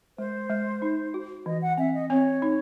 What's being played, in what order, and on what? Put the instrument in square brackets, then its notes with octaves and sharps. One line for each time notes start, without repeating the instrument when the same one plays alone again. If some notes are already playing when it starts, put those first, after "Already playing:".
[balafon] G#3 [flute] C5
[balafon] G#3
D#4
F#4
[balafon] E3 [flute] D#5
[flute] F#5
[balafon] C4 [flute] E5
[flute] D#5
[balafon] C4 [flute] C#5
[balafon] D#4